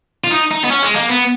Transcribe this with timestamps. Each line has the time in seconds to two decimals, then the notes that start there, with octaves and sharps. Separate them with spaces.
0.24 F4
0.31 D#4
0.51 D#4
0.64 B3
0.70 C#4
0.83 G#3
0.95 A#3
1.09 B3